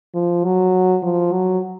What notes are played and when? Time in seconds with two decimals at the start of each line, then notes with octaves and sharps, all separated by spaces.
0.15 F3
0.44 F#3
1.03 F3
1.32 F#3